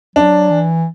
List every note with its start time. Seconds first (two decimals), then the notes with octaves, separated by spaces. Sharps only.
0.16 F#3 D4
0.50 E3